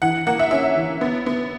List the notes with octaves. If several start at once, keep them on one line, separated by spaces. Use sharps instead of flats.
E3 F#5
A#3 F#5
E5
C#4 E5
E3
B3
B3